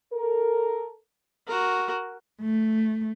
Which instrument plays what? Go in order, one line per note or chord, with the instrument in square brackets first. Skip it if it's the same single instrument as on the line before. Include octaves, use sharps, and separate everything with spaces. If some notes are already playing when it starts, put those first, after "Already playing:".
[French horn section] A4 A#4
[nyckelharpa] F#4 A#4
[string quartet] A3